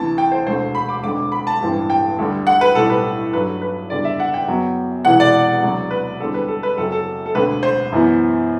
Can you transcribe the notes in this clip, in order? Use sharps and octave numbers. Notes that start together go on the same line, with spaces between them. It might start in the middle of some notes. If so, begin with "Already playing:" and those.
Already playing: D2 C3 E3 A5
G5
C5
E1 D2 D3 A3 C5
B5
D6
E1 D2 D3 A3 C4 D6
B5
A5
A1 G2 E3 G3 C4
G5
D2 D3 G3
F#5
B4
B1 A2 G3 C4 A4
B4
G2 F#3 A3 B4
B4
F#1 E2 D3 G3 D5
E5
F#5
G5
F#2 F#3 B3
E1 E2 C3 E3 F#5
D5
D2 C3 F#3
B4
E2 D3 G3 C4 A4
B4
A4
B4
F#1 F#2 F#3 C4 A4
A4
A4
E1 D2 D3 A3 C4 B4
C5
F#2 E3 B3